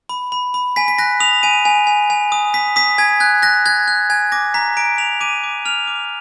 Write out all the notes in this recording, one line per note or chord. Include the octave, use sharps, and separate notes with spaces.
B5
B5
B5
G#5 B6
B6
F#6 A#6
D#6 F7
G#5 D#7
G#5
G#5
G#5
D#6
D#6 B6
D#6 B6
G#5 G#6
F#6 G#6
F#6 A#6
F#6 G#6
F#6
G#5 G#6
D6 A#6
A#5 B6
A#5 D7
A#5 F7
D6 D#7
D6
F6 F7
D6